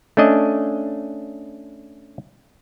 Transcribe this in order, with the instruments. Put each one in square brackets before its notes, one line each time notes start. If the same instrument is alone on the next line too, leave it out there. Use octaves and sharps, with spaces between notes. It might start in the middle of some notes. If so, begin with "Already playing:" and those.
[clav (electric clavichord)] A3 C#4 D4 D#5